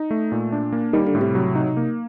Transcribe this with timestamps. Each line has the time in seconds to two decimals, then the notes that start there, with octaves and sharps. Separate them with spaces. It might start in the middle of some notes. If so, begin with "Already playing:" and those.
Already playing: D#4
0.11 A3
0.32 A#2
0.52 D4
0.72 A#3
0.93 D#3 G3
1.07 D3
1.15 A2
1.21 C3
1.35 F#3
1.55 D#4
1.77 A#3